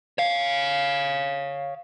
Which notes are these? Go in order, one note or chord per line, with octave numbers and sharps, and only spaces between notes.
C#5 F5